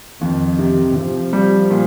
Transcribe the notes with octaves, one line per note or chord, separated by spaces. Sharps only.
F2 D#3
C3
C3 F3
G3
A#2